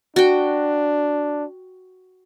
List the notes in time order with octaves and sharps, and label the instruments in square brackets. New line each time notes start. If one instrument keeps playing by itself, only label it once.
[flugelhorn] D4 [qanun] F#4 G5